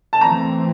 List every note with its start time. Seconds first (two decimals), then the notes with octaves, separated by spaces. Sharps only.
0.13 A5
0.21 E3 A3 C4 A#5